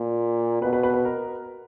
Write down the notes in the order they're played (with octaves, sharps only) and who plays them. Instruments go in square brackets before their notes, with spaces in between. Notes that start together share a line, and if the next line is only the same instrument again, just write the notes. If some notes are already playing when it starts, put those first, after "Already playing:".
Already playing: [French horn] A#2
[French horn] B2 [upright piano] B4
[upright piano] B4
B4
B4
A#4